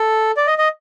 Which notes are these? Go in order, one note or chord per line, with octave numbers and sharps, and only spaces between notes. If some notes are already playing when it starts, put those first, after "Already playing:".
Already playing: A4
D5
D#5
D#5